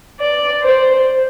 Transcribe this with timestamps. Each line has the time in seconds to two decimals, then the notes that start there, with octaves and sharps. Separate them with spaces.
0.20 D5
0.62 C5